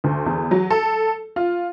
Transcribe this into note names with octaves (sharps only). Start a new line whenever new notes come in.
D2
E2
F#3
A4
F4